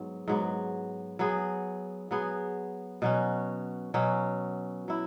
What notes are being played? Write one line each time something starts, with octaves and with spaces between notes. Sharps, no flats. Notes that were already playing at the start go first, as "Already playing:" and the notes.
Already playing: G#2 F#3 B3
G#2 F#3 B3
F#3 B3 G#4
F#3 B3 G#4
B2 F#3 C#4
B2 F#3 C#4
F#3 E4